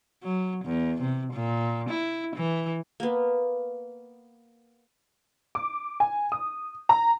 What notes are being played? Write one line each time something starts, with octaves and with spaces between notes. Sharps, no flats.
F#3
E2
C3
A#2
E4
E3
A#3 B3
D6
G#5
D#6
A#5